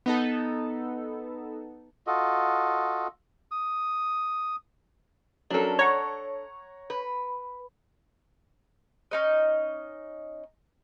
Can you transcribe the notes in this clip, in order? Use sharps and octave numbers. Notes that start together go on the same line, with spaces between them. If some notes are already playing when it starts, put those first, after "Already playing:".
B3 D#4 A4
F4 F#4 A4 D#5
D#6
F#3 C#4 D4 A4 A#4
C#5 F#5 A#5
B4
C#4 D#4 D#5